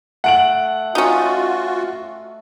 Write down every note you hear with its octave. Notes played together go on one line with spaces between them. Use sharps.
A3 F#5 D7 F#7
C#4 D#4 F4 F#4